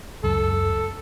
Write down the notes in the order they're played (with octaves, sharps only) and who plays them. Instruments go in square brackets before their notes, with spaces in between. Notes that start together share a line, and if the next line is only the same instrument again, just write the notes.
[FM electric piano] C#2 F#2 [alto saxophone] A4